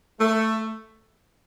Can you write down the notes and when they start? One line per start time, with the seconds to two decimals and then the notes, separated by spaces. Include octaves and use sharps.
0.20 A3